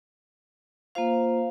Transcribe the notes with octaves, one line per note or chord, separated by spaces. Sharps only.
A#3 F4 C5 F5